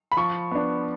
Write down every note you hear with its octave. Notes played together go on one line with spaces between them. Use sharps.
B5
F3 C#6
B3 D4